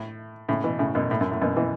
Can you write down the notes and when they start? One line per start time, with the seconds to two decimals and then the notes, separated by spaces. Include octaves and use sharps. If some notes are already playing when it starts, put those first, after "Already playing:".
Already playing: A2
0.49 A2 C#3
0.64 B2 E3
0.79 A2 C#3
0.95 F#2 B2
1.11 A2
1.21 F#2
1.31 A2
1.42 F#2 B2
1.57 B2 E3